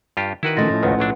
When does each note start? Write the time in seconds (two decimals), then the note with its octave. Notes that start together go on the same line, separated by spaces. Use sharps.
0.17 G2 F4 G4
0.43 D#3 E4 F#4 B4
0.57 F3 A3 C#4 D#5 A6 A#6
0.70 A2
0.83 G#1 C#2 D#3 B4 F#5
0.99 B1 F#3 D4